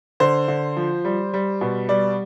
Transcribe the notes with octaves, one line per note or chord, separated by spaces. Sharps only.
D3 C5
D3
F3
G3
G3
B2
G3 D5